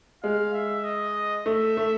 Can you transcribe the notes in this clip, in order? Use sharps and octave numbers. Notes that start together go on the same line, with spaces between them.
G#3 F5
E5
D#5
A3 E5
A3